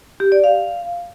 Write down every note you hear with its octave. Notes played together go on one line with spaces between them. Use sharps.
G4
D5
F5